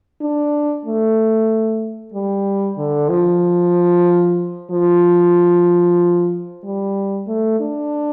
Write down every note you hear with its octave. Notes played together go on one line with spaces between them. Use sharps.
D4
A3
G3
D3
F3
F3
G3
A3
D4